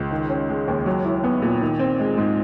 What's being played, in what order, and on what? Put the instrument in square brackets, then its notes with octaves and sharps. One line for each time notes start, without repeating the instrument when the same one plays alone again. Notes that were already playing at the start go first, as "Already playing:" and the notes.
Already playing: [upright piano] C#2
D#3
C#4
G#3
D#2
F#3
E4
B3
A#2
D#3
C4
G#3
G#2